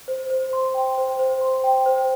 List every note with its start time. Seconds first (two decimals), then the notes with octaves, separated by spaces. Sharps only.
0.08 C5
0.30 C5
0.53 C6
0.74 G5
0.98 C5
1.19 C5
1.41 C6
1.64 G5
1.86 C5